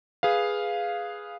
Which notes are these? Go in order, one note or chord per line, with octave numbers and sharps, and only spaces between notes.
G#4 B4 F5